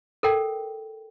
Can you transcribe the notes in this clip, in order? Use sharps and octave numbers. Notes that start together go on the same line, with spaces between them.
A4 A#4 G5